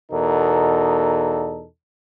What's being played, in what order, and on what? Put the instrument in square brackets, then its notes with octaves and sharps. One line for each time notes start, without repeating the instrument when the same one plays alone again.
[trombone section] E2 B2 D#4 A4 A#4